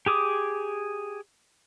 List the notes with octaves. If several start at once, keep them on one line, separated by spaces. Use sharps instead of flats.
G4 G#4 D6 D#6